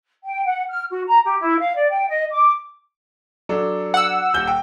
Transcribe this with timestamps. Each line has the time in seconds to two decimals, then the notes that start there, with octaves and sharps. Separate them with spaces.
0.24 G5
0.46 F#5
0.69 F6
0.91 F#4
1.07 A#5
1.25 G4
1.40 E4
1.60 F5
1.77 D5
1.91 G5
2.08 D#5
2.31 D6
3.49 F#3 D4 A4
3.94 F#5 E6
4.34 D#1 G6 G7
4.47 G5